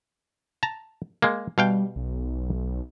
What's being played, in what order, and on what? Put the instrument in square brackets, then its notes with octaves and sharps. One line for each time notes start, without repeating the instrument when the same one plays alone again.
[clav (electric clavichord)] A5 A#5
G#3 A#3
[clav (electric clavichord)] B2 F5 G5 [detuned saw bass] G3
[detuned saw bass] B1